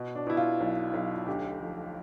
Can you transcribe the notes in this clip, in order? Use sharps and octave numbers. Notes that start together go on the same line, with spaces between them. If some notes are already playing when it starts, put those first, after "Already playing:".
Already playing: B2
D4
B2 E4
F4
B1
B1
F4
D2 G4
F3